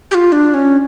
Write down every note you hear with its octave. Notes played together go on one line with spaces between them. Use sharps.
G4
F4
D4
C#4